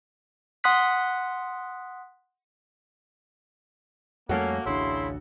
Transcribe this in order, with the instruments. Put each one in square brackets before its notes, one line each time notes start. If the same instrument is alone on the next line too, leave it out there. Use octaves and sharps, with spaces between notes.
[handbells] F#5 C6 D#6 F#6 B6
[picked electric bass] F2 G3 A3 [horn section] A#3 [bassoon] C#4 [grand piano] F#4 A4
[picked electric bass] A1 D2 D4 [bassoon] C#3 [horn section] E4 E5 C6